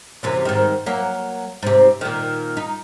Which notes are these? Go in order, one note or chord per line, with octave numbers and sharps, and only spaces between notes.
F#2 C3 E3
G#2 D#3
F#3 A#3
G#2 C3
A#2 D#3
D#4